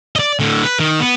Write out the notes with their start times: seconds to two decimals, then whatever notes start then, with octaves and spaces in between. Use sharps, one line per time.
0.16 D5 D#5
0.40 A2 D3
0.63 B4
0.80 D#3
1.00 B3